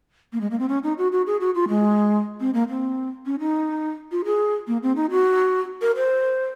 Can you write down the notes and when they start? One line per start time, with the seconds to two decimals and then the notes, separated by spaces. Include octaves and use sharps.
0.33 A#3
0.41 G#3
0.51 A#3
0.59 C4
0.69 C#4
0.83 D#4
0.98 F#4
1.12 F#4
1.27 G#4
1.41 F#4
1.55 F4
1.69 G#3
2.40 C4
2.54 A#3
2.69 C4
3.26 C#4
3.40 D#4
4.12 F4
4.25 G#4
4.67 A#3
4.83 C4
4.96 D#4
5.11 F#4
5.82 A#4
5.96 C5